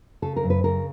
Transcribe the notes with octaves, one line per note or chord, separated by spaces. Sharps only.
C#3 A4
A#4
F#2
B4
C#3 A#4